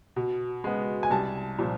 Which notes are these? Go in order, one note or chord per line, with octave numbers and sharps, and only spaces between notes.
B2
G#3 B3
G#5
C2 A5
A#2 F3